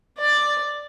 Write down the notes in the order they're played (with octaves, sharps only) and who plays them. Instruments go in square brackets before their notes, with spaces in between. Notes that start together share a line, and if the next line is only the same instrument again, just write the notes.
[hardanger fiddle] D5